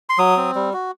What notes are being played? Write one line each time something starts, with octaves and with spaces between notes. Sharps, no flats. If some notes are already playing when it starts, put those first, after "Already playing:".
C6
F#3 D#6
C4
G3
F#4